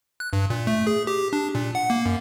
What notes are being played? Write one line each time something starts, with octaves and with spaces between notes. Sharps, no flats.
F#6
G2
A#2
A3
G#4
G4
D4
A#2
F#5
A#3
F#2